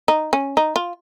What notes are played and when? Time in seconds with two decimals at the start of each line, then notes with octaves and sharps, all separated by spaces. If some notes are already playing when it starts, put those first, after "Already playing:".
0.08 D#4
0.33 C#4
0.57 D#4
0.76 F4